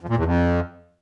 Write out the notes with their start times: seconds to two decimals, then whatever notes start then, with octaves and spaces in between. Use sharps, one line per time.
0.01 F2
0.09 A#2
0.17 E2
0.25 F2